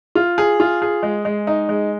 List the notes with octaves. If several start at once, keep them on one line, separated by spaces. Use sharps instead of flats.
F4
G#4
F4
G#4
G#3
G#3
D#4
G#3